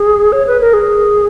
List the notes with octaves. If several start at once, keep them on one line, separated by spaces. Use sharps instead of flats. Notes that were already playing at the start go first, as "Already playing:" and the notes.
Already playing: G#4
C#5
B4
A#4
G#4